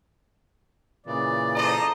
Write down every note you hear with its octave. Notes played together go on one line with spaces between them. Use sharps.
A#2 C#3 E3 D5
A4 C5 D#5 A#5